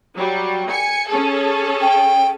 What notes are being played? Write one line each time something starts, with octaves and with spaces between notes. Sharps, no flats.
F#3 G3
G#5 C#7
C#4 G#4 A4
G5